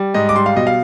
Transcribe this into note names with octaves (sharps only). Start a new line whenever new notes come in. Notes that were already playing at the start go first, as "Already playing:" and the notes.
Already playing: G3
G#2 D#5
D6
G3 C6
F5
B2 D#5
F5